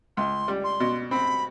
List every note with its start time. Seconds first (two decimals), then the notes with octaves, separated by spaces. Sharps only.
0.17 C#2 C6
0.48 G3
0.64 C6
0.80 B2
1.11 C4 B5